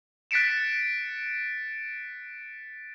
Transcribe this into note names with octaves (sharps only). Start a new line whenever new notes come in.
F#6 A6 B6 C#7 D7 E7